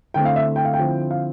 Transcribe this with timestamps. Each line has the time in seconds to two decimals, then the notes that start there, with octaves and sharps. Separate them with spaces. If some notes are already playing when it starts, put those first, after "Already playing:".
0.14 D3 A3 C4 E4 G5
0.25 F5
0.36 E5
0.56 G5
0.65 F5
0.74 G5
0.79 D3 F3 C4 E4
1.11 F5